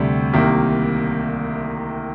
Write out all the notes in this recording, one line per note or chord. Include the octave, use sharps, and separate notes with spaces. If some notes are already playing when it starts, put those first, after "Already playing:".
Already playing: D2 C3 G3
C2 C3 D#3 A#3